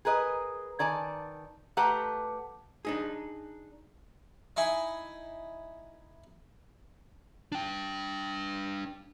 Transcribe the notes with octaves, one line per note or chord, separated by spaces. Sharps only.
G#4 A#4 B4 D#5
D#3 D5 G#5 A5
A3 G4 B4 F#5 A5 A#5
D4 D#4 G#4
D#4 E4 G#5
D4 G5